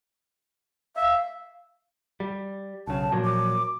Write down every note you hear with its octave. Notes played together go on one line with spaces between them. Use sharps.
E5 F5
G3
B1 C#3 A5
A#2 F3 F#3
D6